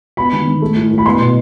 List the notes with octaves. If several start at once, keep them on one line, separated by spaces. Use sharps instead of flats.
B3 B5
D#3
D#3
A3
A2
A2
B5
B3 C6
B2